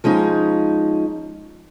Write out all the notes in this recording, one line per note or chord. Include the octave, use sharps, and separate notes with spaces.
F3 G#3 C#4 D#4